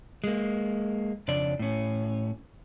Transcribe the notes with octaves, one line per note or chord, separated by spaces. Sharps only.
G#3 A#3
F2 C#3 D4 D5
A2 C#4